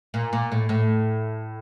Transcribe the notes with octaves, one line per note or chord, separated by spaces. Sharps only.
A#2
A#2
A2
A2